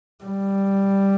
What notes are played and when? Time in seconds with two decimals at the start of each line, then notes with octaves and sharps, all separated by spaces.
0.24 G3